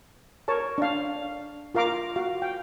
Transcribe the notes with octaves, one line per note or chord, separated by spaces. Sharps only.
A#4 C#5 A5
D4 F5
F4 A#4 F5 A#5 D6
F#4 F5
G5